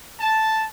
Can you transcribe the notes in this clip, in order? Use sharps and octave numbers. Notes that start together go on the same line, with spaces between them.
A5